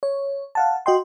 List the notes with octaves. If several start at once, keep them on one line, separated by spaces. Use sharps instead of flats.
C#5
F5 F#5 A5
F#4 D#5 G5 C6